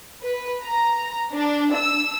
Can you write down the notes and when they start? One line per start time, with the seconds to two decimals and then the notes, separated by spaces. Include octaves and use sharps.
0.23 B4
0.64 A#5
1.33 D4
1.74 E6